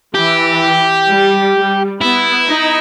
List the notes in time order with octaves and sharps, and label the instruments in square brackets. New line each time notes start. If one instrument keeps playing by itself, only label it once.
[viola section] E3 [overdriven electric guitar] G4
[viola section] G3
G3
[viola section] B3 [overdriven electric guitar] E4
[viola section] D#4